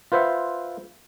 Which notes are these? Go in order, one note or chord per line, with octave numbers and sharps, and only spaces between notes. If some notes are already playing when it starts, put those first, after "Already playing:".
F4 B4 C5 E5 F#5